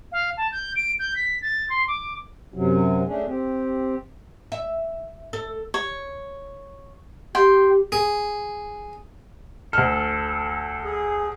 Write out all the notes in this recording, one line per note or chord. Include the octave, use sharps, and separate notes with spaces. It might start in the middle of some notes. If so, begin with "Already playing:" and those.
F5
A5
G6
D7
G6
B6
A6
C6
D6
F#2 C3 F#3
A3 C#4 D4 G#4
C4 G4
E5
A4
C#5
G4 G5 C6
G#4
D2 A4 F6
G#4